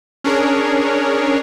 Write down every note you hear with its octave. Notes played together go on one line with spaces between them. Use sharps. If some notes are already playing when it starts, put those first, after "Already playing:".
C#4 D4 G#4 A#4 C#5